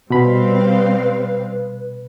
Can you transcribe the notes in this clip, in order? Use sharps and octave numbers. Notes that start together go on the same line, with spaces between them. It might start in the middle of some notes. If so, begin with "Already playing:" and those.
B2 G3 C4 B4 F5 B5